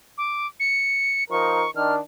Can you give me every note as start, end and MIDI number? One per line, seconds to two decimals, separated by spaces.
0.18 0.47 86
0.60 1.24 97
1.31 1.64 53
1.31 1.64 63
1.31 1.64 70
1.31 1.71 85
1.76 1.98 51
1.76 1.98 62
1.76 1.94 89